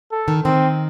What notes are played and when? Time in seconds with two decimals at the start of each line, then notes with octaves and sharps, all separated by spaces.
0.11 A4
0.28 D#3
0.44 D#3 C4